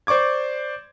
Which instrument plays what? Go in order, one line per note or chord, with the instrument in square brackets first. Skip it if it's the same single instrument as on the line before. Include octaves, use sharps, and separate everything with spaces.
[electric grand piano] C5 D5 C#6 D6 G#6